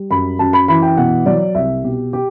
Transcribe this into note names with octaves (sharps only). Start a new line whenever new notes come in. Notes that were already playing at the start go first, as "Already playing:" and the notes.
Already playing: G3
F#2 B5
F#2 A5
B5
E3 B5
G5
B2 F#5
F#3 D5
C2 E5
B2 G4
G4